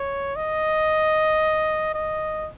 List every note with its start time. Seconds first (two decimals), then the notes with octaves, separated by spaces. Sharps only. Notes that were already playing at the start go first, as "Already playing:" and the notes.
Already playing: C#5
0.36 D#5
1.94 D#5